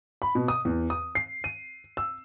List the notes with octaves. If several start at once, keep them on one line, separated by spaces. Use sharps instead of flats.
B5
B2
D#6
E2
D#6
C7
D#7
E6